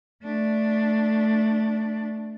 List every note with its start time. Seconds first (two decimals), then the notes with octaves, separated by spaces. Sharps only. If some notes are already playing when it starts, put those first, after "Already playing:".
0.23 A3 D4